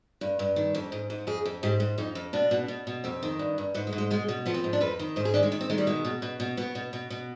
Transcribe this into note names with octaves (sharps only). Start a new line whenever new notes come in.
G2
G2
D#3
F2
G#2
G#2
F2 G#4
F2
G#2 G4
G#2
F2 D#4
F2
B2 D4
B2
B2
B2
F2 C4
D#3
G2
G2
G#2 B3
G#3
G#2
G#3
B2 G#3
B2
F3 B3
C4
G#2
D4
F2 B4
D#3
G#2 C5
G#4
D#3 D4
G#3
D#3
C4
D#3 G#3
G3
B2 G#3
B2
B2
B2
B2 B3
B2
B2
B2